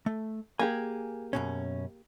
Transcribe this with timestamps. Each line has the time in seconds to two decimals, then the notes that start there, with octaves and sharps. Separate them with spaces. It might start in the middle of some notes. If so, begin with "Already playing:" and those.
0.06 A3
0.59 A#3 G4 G#4 G#5
1.33 F#2 B2 C#4